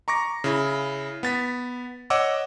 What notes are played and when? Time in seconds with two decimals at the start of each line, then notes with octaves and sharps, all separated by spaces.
0.08 A#5 C#6 D6 A#6
0.44 C#3 E4
1.23 B3 A6 B6
2.10 C#5 D#5 F#5 D6 E6